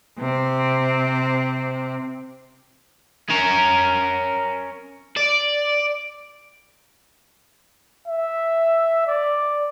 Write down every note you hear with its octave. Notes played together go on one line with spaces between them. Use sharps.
C3 C4
C#4 A#4
D5
E5
D5